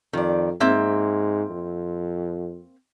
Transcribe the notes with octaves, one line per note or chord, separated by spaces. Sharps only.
F2 D#3 D5
G#2 A#3 C4 E5
F2